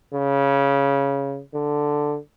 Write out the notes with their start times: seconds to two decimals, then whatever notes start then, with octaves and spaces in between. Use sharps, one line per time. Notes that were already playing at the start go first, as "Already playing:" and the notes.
0.14 C#3
1.54 D3